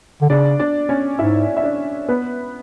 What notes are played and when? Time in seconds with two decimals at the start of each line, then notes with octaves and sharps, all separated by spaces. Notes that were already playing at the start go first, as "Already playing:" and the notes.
0.22 D3
0.30 C#3 D4 D5
0.59 D4 D5
0.89 C#4 C#5
1.18 G#2 E4 E5
1.57 E5
1.63 D4 D5
2.08 B3 B4